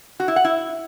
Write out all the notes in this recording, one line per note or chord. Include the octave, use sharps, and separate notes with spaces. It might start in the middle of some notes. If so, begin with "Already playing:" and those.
F#4
E4
F#5
E4